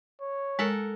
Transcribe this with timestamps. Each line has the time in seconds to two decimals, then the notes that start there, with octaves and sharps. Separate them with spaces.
0.21 C#5
0.59 G#3 A4 A#4 F#5